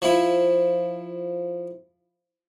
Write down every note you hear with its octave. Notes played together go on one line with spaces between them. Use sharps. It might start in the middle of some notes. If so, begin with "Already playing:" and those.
F3 E4